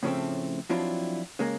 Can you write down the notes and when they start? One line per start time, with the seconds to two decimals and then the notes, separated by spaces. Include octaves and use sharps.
0.03 A2 C#3 F3 G3 A3 C4
0.69 F3 F#3 C4 D4 E4 F4
1.39 C#3 G#3 A#3